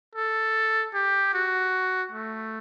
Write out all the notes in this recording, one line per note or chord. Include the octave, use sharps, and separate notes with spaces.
A4
G4
F#4
A3